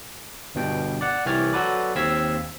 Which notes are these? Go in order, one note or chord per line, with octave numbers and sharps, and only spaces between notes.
G1 G2 B2 G5
D5 F#5
C2 E3 G4 C#5 F6 A6
F#3 F#4 A4 B4 D5
D#2 C4 F5 E6 G#6 B6